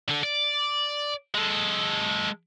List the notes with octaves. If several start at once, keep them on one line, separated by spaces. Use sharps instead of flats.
D3 A4
D5
G#3 A4